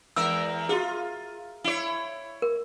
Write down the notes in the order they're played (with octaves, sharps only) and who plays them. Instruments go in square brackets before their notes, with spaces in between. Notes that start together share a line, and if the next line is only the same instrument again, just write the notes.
[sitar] E2 A#4 E5 [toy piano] E6
[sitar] F4 [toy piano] F#4 G#4
[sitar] E4 C#5
[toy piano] A#4